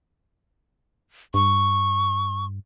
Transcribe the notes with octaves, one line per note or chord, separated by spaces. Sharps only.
G2 C#6